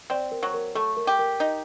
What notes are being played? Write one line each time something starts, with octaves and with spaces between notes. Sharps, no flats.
C4 D5
A#4
F#3
A#4
A3 A4
A#4
G4
A#4
D#4